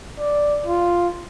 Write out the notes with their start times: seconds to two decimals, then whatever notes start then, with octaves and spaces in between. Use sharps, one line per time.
0.19 D5
0.66 F4